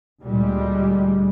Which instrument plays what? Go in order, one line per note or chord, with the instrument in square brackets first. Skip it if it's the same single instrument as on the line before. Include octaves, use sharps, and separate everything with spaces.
[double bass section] D2 A#2 G3 G#3